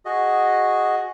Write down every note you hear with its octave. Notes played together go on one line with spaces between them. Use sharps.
F#4 G#4 D#5